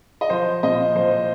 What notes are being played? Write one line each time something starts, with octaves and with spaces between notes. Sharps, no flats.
D#5
F3 C5
A#2 D#5
F3 C5
C5